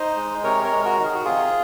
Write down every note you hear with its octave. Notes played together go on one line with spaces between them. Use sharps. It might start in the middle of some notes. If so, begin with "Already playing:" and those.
Already playing: D#4 C5 D#5
G#3
C3 A#4 C#5
A#4 C#5
G#3
F#4 A#4
D#3
G#4
F#4
C3 F4 G#4